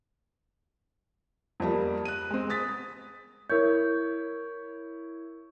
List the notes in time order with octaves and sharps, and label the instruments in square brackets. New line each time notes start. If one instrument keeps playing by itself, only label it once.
[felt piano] F2 F3 G3 A#3
F#6 D#7
G#3 C4
D#6 A6 B6
[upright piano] E4 C#5 [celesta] A#4 G6